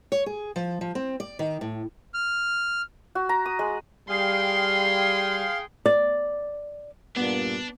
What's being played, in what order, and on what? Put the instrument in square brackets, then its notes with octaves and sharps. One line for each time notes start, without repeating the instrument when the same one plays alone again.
[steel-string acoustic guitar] C#5
G#4
F3
F3
C4
D5
D#3
A2
[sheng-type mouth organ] F6
[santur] F#4
A#5
D#6
G#3
[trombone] G3 [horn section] G#4 G5 [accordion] F5 [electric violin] C6
[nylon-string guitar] D5
[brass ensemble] G2 A#2 [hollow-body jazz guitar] B3 [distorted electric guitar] D4